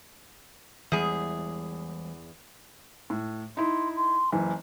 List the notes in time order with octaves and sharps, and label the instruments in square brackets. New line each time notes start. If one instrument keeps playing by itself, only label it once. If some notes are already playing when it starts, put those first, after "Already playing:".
[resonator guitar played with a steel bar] E2 G#4 [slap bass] E3 G3 G#3
[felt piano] A2
[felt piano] D#4 E4 [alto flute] C6
[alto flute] C6
[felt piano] F#1 E3 [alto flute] G#5